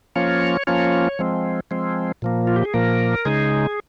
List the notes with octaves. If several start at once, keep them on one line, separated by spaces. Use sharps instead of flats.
F3 A#3 C#4 F4 C#5
F3 A#3 C#4 F4 C#5
F3 G#3 C4
F3 G#3 C4
A#2 F3 A#3
F4
G4
G#4
A#2 F3 A#3 A#4
C#3 G#3 D#4 G#4